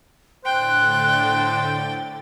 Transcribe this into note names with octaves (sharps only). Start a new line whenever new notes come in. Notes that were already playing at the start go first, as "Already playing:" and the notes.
A2 D3 C5 G5 F#6 A6